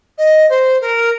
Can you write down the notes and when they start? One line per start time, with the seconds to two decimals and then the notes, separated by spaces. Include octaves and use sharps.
0.17 D#5
0.49 C5
0.80 A#4